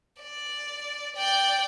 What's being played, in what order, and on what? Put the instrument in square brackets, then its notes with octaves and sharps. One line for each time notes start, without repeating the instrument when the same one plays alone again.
[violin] D5
D5 G5